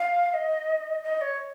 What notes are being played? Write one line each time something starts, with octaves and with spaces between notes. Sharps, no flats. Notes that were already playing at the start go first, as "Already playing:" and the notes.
Already playing: F5
F5
D#5
D#5
C#5